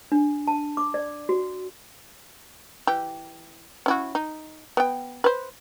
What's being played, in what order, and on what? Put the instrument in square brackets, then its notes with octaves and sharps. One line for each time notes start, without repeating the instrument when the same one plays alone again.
[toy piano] D4
A5
D6
D5
F#4
[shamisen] E3 G4
C#4 E4 F#4
D#4
B3 G5
B4 C5